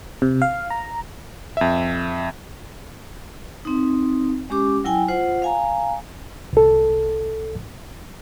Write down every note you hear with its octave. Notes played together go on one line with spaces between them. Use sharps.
C3
F5
A#5
F2 E5
C4 D#4
G#3 C#4 G4 D6
F#3 E4 G5 G#5
F4 C5 F#5
F5 G#5 A#5
C2 A4